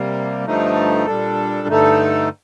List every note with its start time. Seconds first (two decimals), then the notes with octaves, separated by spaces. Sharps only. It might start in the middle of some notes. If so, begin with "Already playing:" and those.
Already playing: C3 G3 A#3
0.45 G2 D3 F3 A3 D#4
1.06 A#2 G3 D4 A4
1.68 G2 D3 A3 D#4 A4